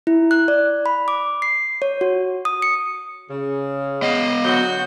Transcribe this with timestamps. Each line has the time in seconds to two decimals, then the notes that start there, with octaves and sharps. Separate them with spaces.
0.07 E4
0.31 F#6
0.48 D5
0.86 B5
1.08 D6
1.42 C7
1.82 C#5
2.01 F#4
2.45 D#6
2.62 C#7
3.30 C#3
4.02 B3 D#5 F5
4.45 D3 F#3 F#4 G6